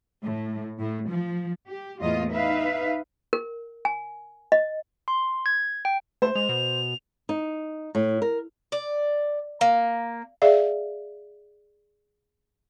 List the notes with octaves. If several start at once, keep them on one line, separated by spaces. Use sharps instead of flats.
A2
A2
F3
G4
E2 A2 A#3 F4 D#5
D#4 B4 E5 F5
A#4
G#5
D#5
C6
G#6
G5
A3 C5
G#3 F7
B2
D#4
A2
A#4
D5
A#3
G#4 D5 E5 F5